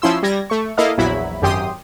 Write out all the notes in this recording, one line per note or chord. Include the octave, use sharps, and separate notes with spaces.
F3 C#4 E4 C6 E6
G3 G#6 A#6
A3 C#6
A#3 E4 A4 D#5 F5
A#1 E2 F#3 E4 B5
G#1 F#2 G4 G5 C6 D#6